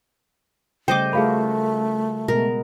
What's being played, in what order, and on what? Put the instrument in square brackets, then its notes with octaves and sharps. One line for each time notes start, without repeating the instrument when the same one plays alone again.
[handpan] C#3 G3 A3 [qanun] C5 D#5 D6 [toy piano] G5
[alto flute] A3 [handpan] F4 F#4 A#4 [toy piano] G#4 F5 B5
[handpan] B2 G#3 B3 [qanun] A#4